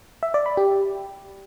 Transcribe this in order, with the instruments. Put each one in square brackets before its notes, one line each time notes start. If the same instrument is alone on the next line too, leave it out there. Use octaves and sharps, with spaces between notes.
[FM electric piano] E5
D5
B5
G4